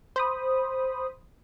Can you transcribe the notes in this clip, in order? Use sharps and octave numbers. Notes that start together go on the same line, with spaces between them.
C5 B5 D#6